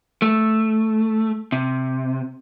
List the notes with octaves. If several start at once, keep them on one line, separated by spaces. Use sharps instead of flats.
A3
C3